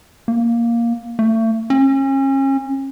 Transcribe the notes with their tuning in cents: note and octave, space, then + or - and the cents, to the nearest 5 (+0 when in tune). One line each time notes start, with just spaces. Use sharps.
A#3 +5
A3 +35
C#4 -35